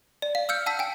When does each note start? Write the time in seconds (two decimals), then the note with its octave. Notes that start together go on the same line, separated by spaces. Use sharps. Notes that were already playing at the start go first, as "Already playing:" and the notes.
0.22 D5
0.35 F5
0.49 E6 F6 G6 C#7
0.66 F#5 A5 E6 B6
0.79 G5 G#5